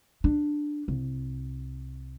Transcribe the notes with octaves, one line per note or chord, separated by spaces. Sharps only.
D4
C2